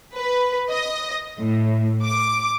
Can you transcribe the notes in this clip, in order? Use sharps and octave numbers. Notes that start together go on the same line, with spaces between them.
B4
D#5
A2
D6